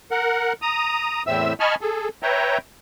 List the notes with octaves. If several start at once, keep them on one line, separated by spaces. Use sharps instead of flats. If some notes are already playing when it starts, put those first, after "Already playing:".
A#4 F#5
A#5 D#6
E2 A2 C4 E5 E6
D#5 G#5 A5 B5 C#6 F6
G#4 A4
B4 C#5 E5 G5 A#5